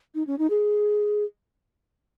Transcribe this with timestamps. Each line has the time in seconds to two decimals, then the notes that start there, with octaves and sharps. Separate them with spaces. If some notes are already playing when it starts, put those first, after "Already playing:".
0.15 D#4
0.27 C#4
0.39 D#4
0.50 G#4